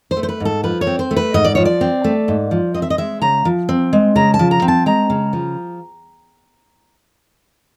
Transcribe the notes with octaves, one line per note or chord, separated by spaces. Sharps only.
C5
A3
C5
B4
G#2 A4
F3 B4
C#5
C4
C5
A3
B4
G#2 D#5
D5
F3 C#5
D5
C4
A3
G#2
F3
C4 D#5
E5
D#5
G#3 E5
C#3 A#5
F3
C4
G#3
C#3 A#5
A5
F3
A#5
C4
A5
G#3 A#5
C#3
F3